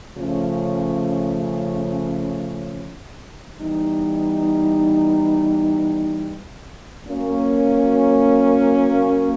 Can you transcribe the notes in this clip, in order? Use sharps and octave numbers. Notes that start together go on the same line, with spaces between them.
C#3 F3 A3 C#4
E3 G3 B3 D#4
F#3 A#3 C#4